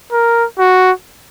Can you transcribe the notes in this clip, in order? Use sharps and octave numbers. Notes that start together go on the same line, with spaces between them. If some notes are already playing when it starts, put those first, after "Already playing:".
A#4
F#4